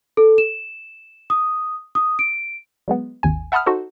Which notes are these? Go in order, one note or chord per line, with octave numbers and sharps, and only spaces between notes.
A4
E7
D#6
D#6
D7
F#3 G#3 B3
G#1 D#2 G#5
E5 F#5 A5 B5 D#6 F6
D#4 F#4 A4 C5